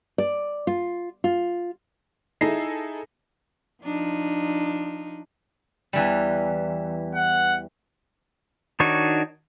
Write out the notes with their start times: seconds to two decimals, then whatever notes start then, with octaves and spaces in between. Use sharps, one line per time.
0.18 D5
0.67 F4
1.24 F4
2.41 D#4 E4 G#4 A4 A#6 C7
3.84 F3 D4 D#4
5.93 E2 E3 G3
7.15 F#5
8.80 D#3 D4 D#4 F#4 C#5